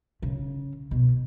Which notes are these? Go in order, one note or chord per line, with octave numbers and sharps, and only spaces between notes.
C#3
B2